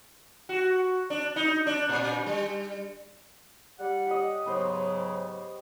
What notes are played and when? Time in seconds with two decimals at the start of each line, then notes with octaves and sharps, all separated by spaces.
0.49 F#4
1.10 D4
1.36 D#4
1.67 D4
1.89 A#2
2.26 G3
3.79 G3 F#5
4.07 G4 D#5
4.46 G#2 C#3 F#3 B3 C5 C#5